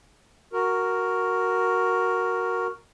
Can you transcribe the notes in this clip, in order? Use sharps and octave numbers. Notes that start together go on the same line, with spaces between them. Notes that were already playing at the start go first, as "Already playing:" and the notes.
F#4 A#4